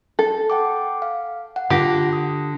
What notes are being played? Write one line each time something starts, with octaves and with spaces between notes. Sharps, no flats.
A4
F#5 G5 D6
F5
F#5
D3 F4 G4 A#6
D#6